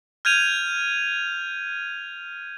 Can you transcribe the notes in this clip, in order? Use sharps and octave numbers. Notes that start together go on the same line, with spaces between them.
F6 G6 G#6 D#7 F7